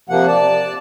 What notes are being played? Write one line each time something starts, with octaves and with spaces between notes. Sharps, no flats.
C3 F3 A#3 F#5
D5 A5